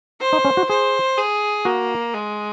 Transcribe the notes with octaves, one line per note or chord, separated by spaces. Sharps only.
C5
D#4
C#4
F#4
G#4 C5
G#4
A#3 F#4
G#3